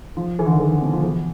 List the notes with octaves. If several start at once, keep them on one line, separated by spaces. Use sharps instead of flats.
F3
E3
D3
D#3
E3
D3
B2
F3
E3